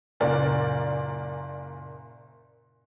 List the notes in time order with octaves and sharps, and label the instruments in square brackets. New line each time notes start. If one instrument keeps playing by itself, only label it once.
[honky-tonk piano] F#1 A#2 A#4 D5